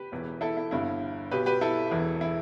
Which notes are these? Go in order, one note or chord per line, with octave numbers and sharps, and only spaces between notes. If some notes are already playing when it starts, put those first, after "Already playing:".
Already playing: G4 B4
E1 E2 E3
E4 A4
E4
G1 G2 D3 E4
B1 B2 G4 B4
G4 B4
E4 A4
E1 E2 E3
E4